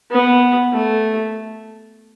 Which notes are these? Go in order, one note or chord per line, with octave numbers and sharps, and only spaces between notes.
B3
A3